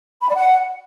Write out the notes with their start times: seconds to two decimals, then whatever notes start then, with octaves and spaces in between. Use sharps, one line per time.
0.22 B5
0.29 D5
0.35 F#5